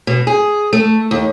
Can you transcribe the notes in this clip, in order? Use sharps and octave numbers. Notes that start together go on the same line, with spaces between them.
B2
G#4
A3
D#2